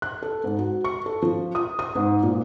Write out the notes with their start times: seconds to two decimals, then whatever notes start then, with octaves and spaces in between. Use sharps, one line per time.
0.02 F#6
0.22 A4
0.44 G#2
0.59 F#4
0.84 C#6
1.06 A4
1.22 F3
1.55 D#6
1.79 D#6
1.96 G#2
2.23 A#2